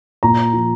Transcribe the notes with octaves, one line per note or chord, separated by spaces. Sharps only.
A#2 A#5
F3